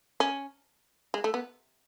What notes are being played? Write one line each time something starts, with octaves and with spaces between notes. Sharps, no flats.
C#4
G#3
A3
B3